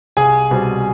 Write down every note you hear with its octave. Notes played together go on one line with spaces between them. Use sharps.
C2 G#4 G#5
B2 G3 C4